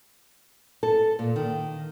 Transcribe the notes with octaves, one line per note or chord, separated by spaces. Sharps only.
A4
A#2
D#3